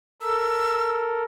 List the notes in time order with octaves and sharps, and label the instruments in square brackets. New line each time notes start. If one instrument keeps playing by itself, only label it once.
[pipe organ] A4 A#4 [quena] E6